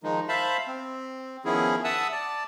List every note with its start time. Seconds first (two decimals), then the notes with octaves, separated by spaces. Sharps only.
0.03 D#3 F3 G#3 D#4
0.29 C5 E5 F5 A5 B5
0.67 C4
1.45 D#3 F3 B3 C#4 E4 G#4
1.84 E5 F#5 A5 D#6 E6 F#6
2.12 D5 A5